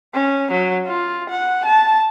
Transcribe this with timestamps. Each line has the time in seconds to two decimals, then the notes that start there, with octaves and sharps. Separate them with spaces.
0.14 C#4
0.51 F#3
0.87 F4
1.29 F#5
1.65 A5